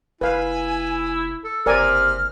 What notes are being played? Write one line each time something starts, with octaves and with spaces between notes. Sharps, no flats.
F1 E4 B4 F5 G#5
A4
F#1 C3 A#4 D5 G#5 F6